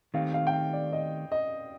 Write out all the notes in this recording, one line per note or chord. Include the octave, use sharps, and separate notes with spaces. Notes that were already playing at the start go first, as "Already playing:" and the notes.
D#3 A3 C4 G4 F5
F5
G5
F5
D5
D#5
D#5